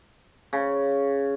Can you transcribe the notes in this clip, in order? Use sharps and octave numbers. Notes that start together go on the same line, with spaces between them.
C#3